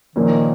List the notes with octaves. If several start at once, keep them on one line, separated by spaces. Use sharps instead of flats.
A#2 D#3 F3 A#3 C#4